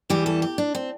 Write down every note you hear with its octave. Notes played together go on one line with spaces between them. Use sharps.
E2 E3 G3 G4
A4
G4
D4
C4